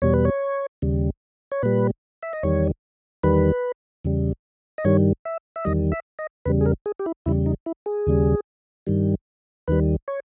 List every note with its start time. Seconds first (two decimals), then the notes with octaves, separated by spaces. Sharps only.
0.02 E2 B2 G3 C#5
0.14 B4
0.25 C#5
0.82 D#2 C#3 G3
1.52 C#5
1.63 A#2 G3 B4
2.23 E5
2.33 D#5
2.43 E2 D#3 G3 C#5
3.23 E2 D#3 G3 B4
4.04 E2 C#3 G3
4.78 D#5
4.84 G2 D#3 G3 C#5
5.25 E5
5.56 E5
5.65 E2 D#3 G3 D#5
5.92 E5
6.19 D#5
6.45 E2 C#3 G3 B4
6.61 G#4
6.66 A#4
6.86 G#4
6.99 G4
7.06 E4
7.26 E2 C#3 G3 E4
7.46 D#4
7.66 E4
7.86 G#4
8.07 D#2 C#3 G3
8.87 G2 D#3 G3
9.68 D#2 D#3 G3 B4
10.08 C#5